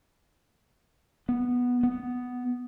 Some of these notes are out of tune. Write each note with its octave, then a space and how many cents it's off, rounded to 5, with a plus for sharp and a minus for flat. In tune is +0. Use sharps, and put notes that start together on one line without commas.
B3 -5
B3 +5